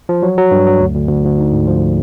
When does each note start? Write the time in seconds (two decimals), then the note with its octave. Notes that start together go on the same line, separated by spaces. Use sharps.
0.09 F3
0.23 F#3
0.38 F#3
0.51 G2
0.67 F#3
0.80 D2
0.95 D2
1.09 D2
1.25 D2
1.39 D#4
1.52 G#2
1.67 F3